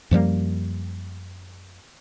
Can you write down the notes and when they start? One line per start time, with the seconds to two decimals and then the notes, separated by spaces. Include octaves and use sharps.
0.11 F#2 F3 G3 A#3